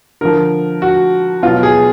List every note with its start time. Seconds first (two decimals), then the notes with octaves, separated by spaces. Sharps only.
0.21 D3 F3 A#4
0.82 F#4
1.43 B2 F#3 F4
1.63 G#4